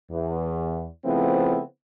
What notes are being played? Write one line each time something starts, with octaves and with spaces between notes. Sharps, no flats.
E2
C#3 F3 A3 B3 C4 E4